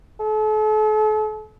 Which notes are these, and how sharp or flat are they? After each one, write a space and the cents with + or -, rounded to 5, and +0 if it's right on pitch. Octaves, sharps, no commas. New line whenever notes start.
A4 -40